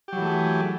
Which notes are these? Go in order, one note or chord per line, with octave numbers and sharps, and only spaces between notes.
E3 F#3 A3 G4 G#4